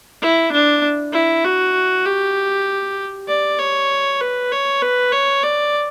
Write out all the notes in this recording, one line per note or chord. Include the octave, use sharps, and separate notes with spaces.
E4
D4
E4
F#4
G4
D5
C#5
B4
C#5
B4
C#5
D5